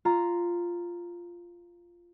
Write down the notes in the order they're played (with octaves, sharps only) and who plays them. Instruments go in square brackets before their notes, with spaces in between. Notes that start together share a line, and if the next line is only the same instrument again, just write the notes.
[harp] F4 A#5